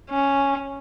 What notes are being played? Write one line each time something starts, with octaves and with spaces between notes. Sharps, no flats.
C#4